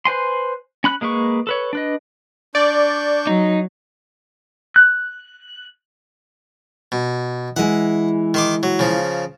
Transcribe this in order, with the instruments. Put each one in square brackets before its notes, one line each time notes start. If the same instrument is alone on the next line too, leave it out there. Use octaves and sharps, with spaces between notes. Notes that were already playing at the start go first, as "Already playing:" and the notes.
[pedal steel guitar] B4 C5 G#5 C6
C#4 B5 F#6
G#3 A#3 G#4 B4 C#6
A4 B4 C#5
D4 B4 D#5
[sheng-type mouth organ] D4 C#6 G6 [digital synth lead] D5
[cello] F#3 [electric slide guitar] D#4
[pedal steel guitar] F#6
[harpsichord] B2
[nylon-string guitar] E3 G#3 [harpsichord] F#5
[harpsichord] D#3 C6 D6
F#3
C#3 F3